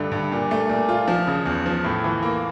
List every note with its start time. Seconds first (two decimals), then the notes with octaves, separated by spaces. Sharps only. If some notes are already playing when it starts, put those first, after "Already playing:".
Already playing: G2 D3 A3
0.12 G2
0.32 A#2
0.51 A3
0.69 A#2
0.89 F4
1.08 F3
1.27 C#3
1.46 E2
1.66 F3
1.84 A2
2.04 E3
2.22 A#3